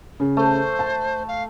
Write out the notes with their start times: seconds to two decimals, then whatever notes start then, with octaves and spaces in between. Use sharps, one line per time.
0.20 C#3
0.37 A3 C5
0.79 A5
1.28 F5